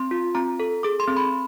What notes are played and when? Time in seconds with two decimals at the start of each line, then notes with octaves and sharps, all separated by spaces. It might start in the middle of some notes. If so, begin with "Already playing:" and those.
Already playing: C4 C6
0.11 F4
0.35 C4 A#5
0.60 A4
0.83 G#4 D6
1.00 C6
1.08 C4
1.17 B5